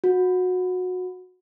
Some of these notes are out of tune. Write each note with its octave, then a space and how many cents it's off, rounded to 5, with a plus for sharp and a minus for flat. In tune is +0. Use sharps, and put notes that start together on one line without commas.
F#4 -20